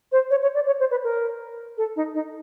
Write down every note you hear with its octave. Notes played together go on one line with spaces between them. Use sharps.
C5
C#5
C#5
D5
C#5
C5
B4
A#4
A4
D#4
D#4